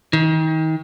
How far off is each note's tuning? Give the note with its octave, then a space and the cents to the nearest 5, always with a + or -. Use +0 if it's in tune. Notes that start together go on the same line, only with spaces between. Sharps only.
D#3 +35